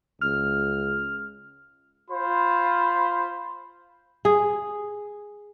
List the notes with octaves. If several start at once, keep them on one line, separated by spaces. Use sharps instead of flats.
C#2 F6
F4 C5 B5
G#4